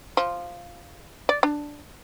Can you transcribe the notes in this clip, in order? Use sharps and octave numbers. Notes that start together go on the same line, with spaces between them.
F3
D5
D4